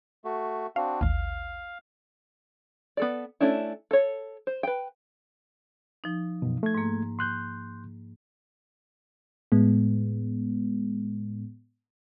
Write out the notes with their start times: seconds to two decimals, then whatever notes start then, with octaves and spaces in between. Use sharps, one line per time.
0.25 A3 F#4
0.76 C4 D4 F#4 F5
1.01 A1 D#2 F5
2.97 B3 A4 D5
3.40 A3 C#4 D4 E4
3.91 A4 C#5
4.47 C5
4.63 B4 G5
6.04 F3 D#4
6.42 F#2 B2
6.63 A3 G#6
6.75 G#2 A#3
7.19 C6 F#6 G6
9.52 A2 G#3 B3